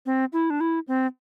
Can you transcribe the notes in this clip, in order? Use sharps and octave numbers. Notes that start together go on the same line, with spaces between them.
C4
E4
D4
E4
C4